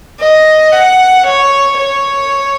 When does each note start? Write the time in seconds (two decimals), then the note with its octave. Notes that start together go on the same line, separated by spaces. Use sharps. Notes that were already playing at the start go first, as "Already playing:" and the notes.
0.20 D#5
0.72 F#5
1.25 C#5
1.77 C#5